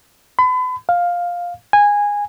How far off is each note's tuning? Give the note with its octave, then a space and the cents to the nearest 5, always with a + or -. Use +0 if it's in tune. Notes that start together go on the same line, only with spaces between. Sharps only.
B5 +40
F5 +10
G#5 -15